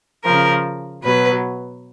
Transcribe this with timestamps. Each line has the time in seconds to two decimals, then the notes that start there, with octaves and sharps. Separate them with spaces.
0.24 C#3 F3 A#4
1.03 B2 F#3 B4